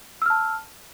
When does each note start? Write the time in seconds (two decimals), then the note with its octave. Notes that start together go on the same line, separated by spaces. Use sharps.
0.22 E6
0.26 F6
0.30 A5